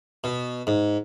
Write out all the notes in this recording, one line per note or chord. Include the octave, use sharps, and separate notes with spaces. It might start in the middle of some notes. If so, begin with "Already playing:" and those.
B2
G#2